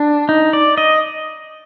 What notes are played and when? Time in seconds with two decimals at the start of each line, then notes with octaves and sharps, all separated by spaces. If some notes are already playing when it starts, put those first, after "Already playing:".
Already playing: D4
0.29 D#4
0.53 D5
0.77 D#5